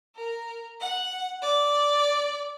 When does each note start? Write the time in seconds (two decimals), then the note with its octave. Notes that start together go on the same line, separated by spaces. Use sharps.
0.16 A#4
0.80 F#5
1.42 D5